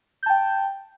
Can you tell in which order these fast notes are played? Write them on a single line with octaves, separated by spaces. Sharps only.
G6 A5 G5